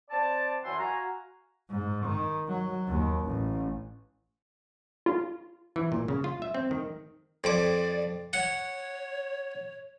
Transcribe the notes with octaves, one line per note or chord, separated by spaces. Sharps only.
C4 D5 A5
F#2 E3 F#5 C6
F#4 F5 G#5 A#5
G#2
D#3
F#3
D#2
A1
F4
E3
A#2
C#3
F4
E5
C4
D#3
F2 D5 D6
C#5 F#5